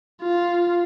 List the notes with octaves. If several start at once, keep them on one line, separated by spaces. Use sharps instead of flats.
F4